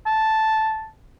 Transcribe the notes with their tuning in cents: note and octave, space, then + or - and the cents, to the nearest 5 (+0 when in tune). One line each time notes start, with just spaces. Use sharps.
A5 -5